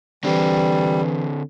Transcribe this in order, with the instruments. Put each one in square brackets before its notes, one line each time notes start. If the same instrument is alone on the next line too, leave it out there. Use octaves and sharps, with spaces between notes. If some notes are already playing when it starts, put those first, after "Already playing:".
[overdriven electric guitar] D3 C4 [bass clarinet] E3 [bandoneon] G3